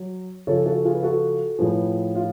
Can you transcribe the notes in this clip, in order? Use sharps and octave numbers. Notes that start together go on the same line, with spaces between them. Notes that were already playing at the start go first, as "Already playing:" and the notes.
Already playing: F#3
C#3 F3 A4 C#5
F#4 A4
F4 G#4
B4
F#4 A4
A2 F3 G#4 B4
F4